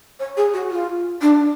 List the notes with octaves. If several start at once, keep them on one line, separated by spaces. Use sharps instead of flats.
C#5
G#4
F#4
F4
D4